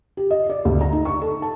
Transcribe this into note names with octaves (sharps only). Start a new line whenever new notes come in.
G4
D#5
D5
D2
A#5
D#4
C#6
A4
A5